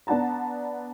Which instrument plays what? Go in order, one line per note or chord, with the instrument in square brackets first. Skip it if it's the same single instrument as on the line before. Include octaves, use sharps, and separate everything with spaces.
[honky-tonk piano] B3 D4 F#5 A5 A#5